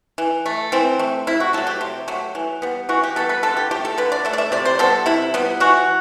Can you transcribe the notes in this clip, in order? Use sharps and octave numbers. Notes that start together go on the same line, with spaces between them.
E3
A3
E3 C4
A3
C3 E4
F#4
F#3 A3 A4
G4
C3
F#3 A3
E3
G3 B3
E3 F#4
G4
G3 B3 A4
B4
D3 A4
G4
A3 G4
A4
D3 B4
D5
A3 E5
D5
E5
C3 D5
C5
G3 B3 A4
C3 E4
G3 B3
E3 F#4